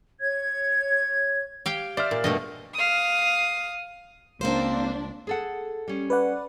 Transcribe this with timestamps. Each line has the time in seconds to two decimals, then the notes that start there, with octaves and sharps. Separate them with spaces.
0.20 C#5 G#6
1.66 G4 F5 G5
1.97 C5 D5 E5 F6
2.11 A#2
2.24 G2 B2 A3 D#5
2.74 F5 D#6
4.41 C#2 A#3 C4 D4 A#4 C5
5.27 G#4 A4 F#5
5.88 G3 C#4
6.10 B4 D5 F#5